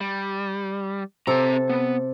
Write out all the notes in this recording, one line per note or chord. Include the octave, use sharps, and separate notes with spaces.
G3
C3 C4 A4 A#5
B3